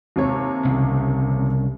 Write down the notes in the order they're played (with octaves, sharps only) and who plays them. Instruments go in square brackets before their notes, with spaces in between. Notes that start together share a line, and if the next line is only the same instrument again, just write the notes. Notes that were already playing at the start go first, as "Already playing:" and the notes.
[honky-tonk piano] D#2 C3 C#5
[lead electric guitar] C2 C#3